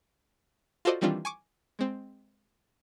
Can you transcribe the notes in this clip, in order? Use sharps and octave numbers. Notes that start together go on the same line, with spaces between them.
F4 F#4 A4 C5 D5 D#5
D#3 E3 G3 C4 D4 F4
G#5 C#6 D6
G#3 C4